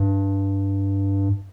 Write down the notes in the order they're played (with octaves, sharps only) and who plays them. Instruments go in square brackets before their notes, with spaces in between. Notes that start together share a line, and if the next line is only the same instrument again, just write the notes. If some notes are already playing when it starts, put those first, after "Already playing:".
Already playing: [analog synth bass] G2